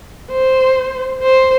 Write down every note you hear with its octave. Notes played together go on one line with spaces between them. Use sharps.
C5
C5